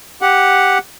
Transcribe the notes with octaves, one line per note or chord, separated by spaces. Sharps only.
G4 F#5